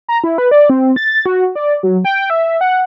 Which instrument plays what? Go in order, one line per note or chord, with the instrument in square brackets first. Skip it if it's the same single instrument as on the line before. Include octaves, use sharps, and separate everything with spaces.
[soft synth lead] A#5
E4
B4
D5
C4
A6
F#4
D5
F#3
G5
E5
F#5